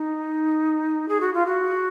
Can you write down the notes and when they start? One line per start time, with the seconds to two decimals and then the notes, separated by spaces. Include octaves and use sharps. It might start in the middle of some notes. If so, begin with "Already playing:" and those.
Already playing: D#4
1.08 G#4
1.20 F#4
1.34 F4
1.46 F#4